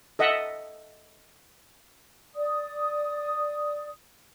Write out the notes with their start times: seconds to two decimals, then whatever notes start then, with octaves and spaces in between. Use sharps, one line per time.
0.19 A4 D#5 E5 F#5
2.35 D5 D#6